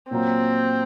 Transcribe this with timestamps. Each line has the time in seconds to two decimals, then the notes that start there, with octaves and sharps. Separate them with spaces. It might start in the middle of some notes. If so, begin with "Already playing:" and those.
0.11 A#2 F#3 A#3 C4